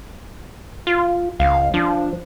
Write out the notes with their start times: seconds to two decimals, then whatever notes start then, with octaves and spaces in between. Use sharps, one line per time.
0.87 F4
1.39 C#2 F5
1.74 F3 D4